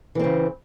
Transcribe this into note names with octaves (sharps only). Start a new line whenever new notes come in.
C#3 E3 C4